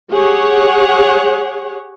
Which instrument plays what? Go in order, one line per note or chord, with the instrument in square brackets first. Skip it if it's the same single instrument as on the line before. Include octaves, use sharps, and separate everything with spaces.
[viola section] G4 G#4 C#5 F#5